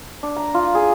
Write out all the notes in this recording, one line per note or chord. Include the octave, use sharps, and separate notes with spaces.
D4
A#5
F4
G#4